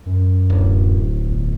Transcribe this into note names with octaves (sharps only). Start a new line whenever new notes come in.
F#2
D1
G1